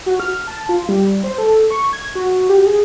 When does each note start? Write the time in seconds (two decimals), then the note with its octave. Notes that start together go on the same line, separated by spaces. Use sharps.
0.06 F#4
0.20 F6
0.47 A5
0.69 F4
0.89 G3
1.24 C5
1.38 A4
1.70 C#6
1.93 G#6
2.15 F#4
2.49 G4
2.66 G#4